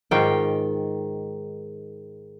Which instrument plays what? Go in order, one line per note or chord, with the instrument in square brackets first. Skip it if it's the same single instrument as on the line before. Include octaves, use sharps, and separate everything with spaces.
[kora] G#2 D#3 F4 G5